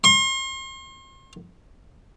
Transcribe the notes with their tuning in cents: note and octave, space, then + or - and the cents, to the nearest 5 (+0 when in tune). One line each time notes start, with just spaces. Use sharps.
C6 +40